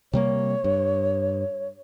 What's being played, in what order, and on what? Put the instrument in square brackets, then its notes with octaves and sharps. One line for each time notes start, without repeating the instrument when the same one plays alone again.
[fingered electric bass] C3 G3 A#3 [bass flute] C#5
[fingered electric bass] G2